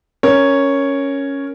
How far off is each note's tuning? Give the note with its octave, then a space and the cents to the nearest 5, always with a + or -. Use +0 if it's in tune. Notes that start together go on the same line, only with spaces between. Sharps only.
C#4 +0 A#4 +0 C#5 +0